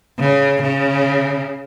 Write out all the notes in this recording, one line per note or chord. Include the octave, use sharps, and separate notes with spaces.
C#3
C#3